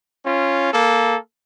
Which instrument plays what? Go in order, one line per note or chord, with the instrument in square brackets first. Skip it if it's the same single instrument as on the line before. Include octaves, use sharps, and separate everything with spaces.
[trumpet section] C#4 F4
A#3 A4